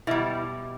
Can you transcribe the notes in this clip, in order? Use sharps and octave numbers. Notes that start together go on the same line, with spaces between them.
B2 G3 E4